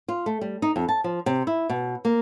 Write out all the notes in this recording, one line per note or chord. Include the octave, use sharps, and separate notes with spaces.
F4
A3
G3
D#4
F2
A5
F3
C3
E4
B2
A#3